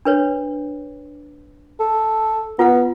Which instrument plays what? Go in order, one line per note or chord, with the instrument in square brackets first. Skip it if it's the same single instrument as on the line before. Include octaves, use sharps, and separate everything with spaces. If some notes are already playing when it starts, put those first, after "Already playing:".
[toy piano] D4 B4 C#5
[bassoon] A4
[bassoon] B3 [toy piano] F4 B4 F#5